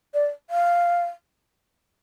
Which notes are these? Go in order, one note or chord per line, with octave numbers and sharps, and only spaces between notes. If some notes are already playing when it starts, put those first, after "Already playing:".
D5
F5